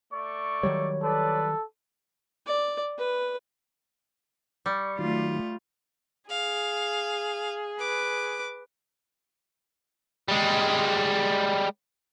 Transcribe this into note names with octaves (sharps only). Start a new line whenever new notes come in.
A3 D5 C#6
D#3 F#3 G3 C#5
A4 B4 D5
D5
B4
G3 C#6
D#3 F#3 A3 F4
G#4 F5
B4 D6
G3 G#3